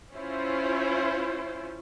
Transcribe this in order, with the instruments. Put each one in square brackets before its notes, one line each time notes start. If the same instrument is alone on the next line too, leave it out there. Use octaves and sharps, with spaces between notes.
[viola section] C#4 E4 F4 C5